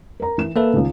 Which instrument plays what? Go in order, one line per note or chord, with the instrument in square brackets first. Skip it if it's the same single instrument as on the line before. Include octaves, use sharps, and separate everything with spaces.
[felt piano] A#4 A#5
E3 E7
[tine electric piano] A#3 A4 B4 [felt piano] E5
[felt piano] C#2 D#3